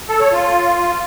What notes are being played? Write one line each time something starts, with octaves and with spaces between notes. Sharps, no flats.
A4
C#5
F4